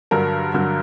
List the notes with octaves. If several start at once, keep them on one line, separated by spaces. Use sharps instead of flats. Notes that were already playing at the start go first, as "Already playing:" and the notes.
G2 D3 F#3 A#4
G2 D3 F#3